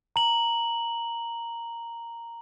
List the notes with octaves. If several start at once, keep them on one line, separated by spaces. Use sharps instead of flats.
A#5 F#7